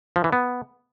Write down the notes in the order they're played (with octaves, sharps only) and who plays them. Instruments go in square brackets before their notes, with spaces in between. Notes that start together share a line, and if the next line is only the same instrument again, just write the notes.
[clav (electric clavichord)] F3
E3
B3